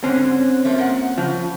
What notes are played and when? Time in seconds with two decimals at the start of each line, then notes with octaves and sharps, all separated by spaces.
0.04 G#2 D3 F#3 C4 C#4
0.65 F3 A3 A#3
0.78 A#2 F#5
1.18 C#3 F3